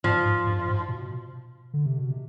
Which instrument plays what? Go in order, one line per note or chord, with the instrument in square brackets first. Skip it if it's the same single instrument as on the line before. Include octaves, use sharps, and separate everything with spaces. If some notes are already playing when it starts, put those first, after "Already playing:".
[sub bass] G#2 [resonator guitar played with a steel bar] F3
[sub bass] G#2
G2
G#2
B2
D3
C3
B2
C3